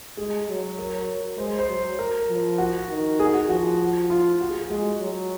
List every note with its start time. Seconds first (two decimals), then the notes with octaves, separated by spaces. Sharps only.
0.17 G#3 G#4
0.48 F#3
0.78 A#4
1.38 G#3 C5
1.59 C5
1.68 F#3
1.99 A#4
2.28 F3
2.58 F#4
2.89 D#3
3.19 G#4
3.34 F#4
3.49 F3 F#4
4.10 F4
4.41 F#4
4.50 G#4
4.60 G#4
4.70 G#3 F#4
5.00 F#3